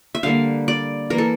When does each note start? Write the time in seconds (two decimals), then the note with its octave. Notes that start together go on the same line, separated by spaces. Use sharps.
0.15 E5
0.23 D3 G3 A#3 F5
0.68 D5
1.10 E3 A#3 A#4
1.18 A4